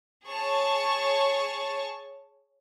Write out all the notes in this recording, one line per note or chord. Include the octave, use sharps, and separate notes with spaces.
G#4 C#5 A5 C#6